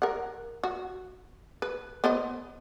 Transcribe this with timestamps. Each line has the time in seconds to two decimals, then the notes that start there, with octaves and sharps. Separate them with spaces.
0.02 A#4 F#5
0.64 F#4
1.62 B4
2.04 B3 C5 D#5